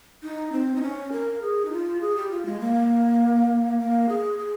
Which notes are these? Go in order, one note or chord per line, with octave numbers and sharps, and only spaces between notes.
D#4
C4
D#4
C#4
A#4
G#4
D#4
F4
G#4
G4
F4
G#3
A#3
A#3
G#4
G#4